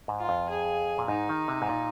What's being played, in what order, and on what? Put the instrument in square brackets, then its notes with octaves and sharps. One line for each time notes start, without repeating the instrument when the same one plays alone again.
[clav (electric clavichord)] G#2
[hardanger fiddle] F4
[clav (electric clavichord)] F2
[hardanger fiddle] G#4
[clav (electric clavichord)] A#2
[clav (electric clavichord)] G#2 [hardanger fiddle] D#4
[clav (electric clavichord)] D#3
C3
G#2
A#2